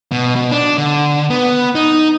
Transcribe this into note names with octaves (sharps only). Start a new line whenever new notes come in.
B2
B2
D4
D3
B3
D#4